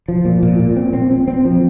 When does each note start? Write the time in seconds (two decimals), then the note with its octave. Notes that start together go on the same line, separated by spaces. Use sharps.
0.08 F3
0.25 A#2
0.43 A#2
0.59 A#2
0.77 C4
0.93 C4
1.11 C4
1.28 C4
1.45 F3